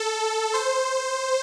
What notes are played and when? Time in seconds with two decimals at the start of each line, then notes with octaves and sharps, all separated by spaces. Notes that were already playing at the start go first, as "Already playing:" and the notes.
Already playing: A4
0.54 C5